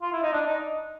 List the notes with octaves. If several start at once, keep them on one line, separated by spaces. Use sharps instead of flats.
F4
E4
D#4
D4
D#4